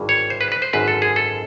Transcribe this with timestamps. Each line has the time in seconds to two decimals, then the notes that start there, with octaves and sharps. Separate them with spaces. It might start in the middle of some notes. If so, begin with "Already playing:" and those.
Already playing: G#1 G2 E3
0.09 C#5
0.30 C5
0.41 B4
0.52 B4
0.62 C5
0.73 G#1 F#2 D3 B4
0.88 A4
1.02 G#4
1.16 A4